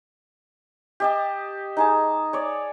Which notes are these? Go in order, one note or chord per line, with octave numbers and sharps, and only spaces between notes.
G4 D#5 A5
D#4 G#4 A5
C#5 D5